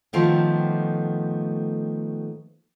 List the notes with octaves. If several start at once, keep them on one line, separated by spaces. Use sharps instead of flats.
A2 D#3 F3 A3 B3 G4